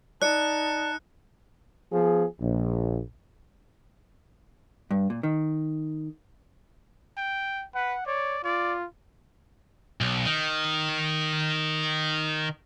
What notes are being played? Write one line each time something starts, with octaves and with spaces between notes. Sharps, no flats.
D#4 D5 A5 F#6 C#7
F3 B3 G#4
A#1
G2
A#2
D#3
G5
B4 F#5
C#5 D5
F4 D5
B1
D#3